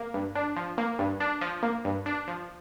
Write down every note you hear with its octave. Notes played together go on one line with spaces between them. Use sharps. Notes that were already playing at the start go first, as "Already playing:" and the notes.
Already playing: A#3
G2
D4
F3
A#3
G2
D4
F3
A#3
G2
D4
F3